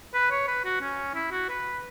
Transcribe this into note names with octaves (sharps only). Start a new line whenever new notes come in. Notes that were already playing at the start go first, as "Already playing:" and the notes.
B4
C#5
B4
F#4
C#4
E4
F#4
B4